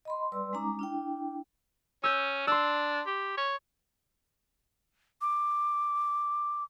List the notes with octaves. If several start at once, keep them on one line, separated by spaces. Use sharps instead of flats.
D#5 B5 C6
G3 B4 D5 C6 E6
G#3 C#4 D#4 A#5 D6
D4 E4 G5
C#4 E6 G6
D4 C6 E6
G4
C#5
D6